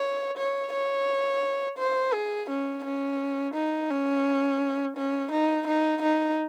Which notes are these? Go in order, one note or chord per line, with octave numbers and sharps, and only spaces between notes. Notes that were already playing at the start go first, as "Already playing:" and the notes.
Already playing: C#5
C#5
C#5
C5
G#4
C#4
C#4
D#4
C#4
C#4
D#4
D#4
D#4